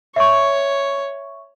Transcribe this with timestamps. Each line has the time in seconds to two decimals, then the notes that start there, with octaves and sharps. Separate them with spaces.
0.16 C#5 E5 C#6